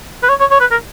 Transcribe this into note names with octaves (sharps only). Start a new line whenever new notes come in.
B4
C#5
C#5
C#5
B4
A#4